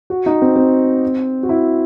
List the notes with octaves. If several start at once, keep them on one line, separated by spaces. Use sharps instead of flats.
F#4
D#4
C4
C4
F#4
E4